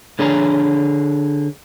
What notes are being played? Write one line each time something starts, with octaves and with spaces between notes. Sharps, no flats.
D3 D4 G#4 C#5 A5 A#5